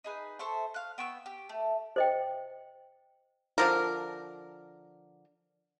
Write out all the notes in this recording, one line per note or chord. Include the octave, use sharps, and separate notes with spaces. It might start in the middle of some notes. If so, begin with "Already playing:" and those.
D#4 G#4 B4
A4 C5 E5 C#6
F5 F#6
B3 G5 C#6 E6
G4
A3
C5 D#5 G5
D3 F3 A#4